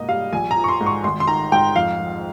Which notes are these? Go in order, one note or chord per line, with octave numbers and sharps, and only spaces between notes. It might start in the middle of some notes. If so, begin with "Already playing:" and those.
Already playing: G#2 C3 A#3 D#5
G3 F5
A#1 G#5
A#5
F3
C#6
C6
G#2
C#6
G#1 C6
C6
D#3 A#5
G#2 G5
F2 F5
F3